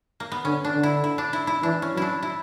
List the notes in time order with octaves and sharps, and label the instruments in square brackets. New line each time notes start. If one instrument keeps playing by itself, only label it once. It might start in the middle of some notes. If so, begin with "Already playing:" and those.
[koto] A#3
B3
[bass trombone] D3 [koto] C#4
[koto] D4
[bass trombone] D3
[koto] E4
E4
D4
E4
E4
[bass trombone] E3 [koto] D4
[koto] C#4
[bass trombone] F#3
[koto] D4 E4
E4